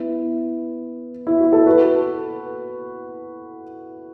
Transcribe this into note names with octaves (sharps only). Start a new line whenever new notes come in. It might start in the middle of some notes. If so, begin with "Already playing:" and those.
Already playing: B3 E4
E4
F#4
A4
F#4 B4